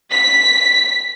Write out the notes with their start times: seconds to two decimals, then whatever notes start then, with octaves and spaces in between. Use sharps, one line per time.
0.11 B6